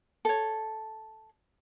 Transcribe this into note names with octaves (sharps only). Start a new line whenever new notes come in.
A4 C#5